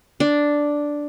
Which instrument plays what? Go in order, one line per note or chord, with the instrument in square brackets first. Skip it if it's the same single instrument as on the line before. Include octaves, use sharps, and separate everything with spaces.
[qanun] D4